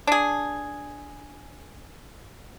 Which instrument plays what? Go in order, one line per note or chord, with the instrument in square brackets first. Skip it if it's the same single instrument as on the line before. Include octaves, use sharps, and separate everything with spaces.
[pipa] D4 G#4